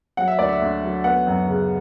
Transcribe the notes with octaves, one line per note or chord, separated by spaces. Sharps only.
F#3 F#5
E5
D2 D5
E5
D2
F#3
B3 F#5
F#2
C#3